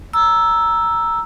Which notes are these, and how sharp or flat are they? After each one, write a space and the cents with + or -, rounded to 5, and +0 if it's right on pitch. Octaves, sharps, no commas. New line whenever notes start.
A#5 +0 E6 +0